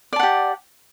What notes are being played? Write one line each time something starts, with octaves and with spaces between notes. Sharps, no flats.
G4 D5 F#5 A5